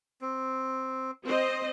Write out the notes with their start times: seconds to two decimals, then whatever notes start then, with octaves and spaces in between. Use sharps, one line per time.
0.21 C4
1.25 C4 C5 D#5